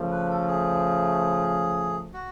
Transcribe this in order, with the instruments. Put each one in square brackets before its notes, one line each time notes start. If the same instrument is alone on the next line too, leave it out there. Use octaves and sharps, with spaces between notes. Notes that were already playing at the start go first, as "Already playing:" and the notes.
Already playing: [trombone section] C#3 F3 A3
[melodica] B4
A4
G#4
F#4